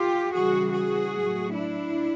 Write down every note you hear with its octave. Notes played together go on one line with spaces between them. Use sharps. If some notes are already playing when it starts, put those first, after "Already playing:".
Already playing: F4 G4
C#3 E3 G3 F#4 G#4
F#4 G#4
A2 F#3 A3
D4 E4